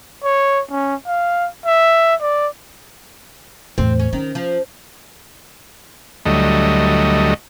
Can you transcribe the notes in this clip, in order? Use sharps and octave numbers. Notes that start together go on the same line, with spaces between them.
C#5
C#4
F5
E5
D5
E2 A2 C4
C#4
D#3 C#4
F3
D2 F#3 G3 A3 D#5